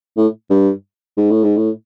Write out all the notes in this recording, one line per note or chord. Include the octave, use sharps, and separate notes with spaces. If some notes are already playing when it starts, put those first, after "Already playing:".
A2
G2
G#2
A2
G#2
A2